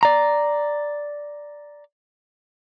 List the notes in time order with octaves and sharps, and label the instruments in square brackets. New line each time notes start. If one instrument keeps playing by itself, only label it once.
[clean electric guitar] D5 A#5